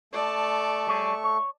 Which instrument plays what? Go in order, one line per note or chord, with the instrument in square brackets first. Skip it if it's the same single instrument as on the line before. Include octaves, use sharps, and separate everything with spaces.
[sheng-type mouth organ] A3 C#6 [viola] D5 A5
[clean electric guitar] G3 G#4 C#5
C#5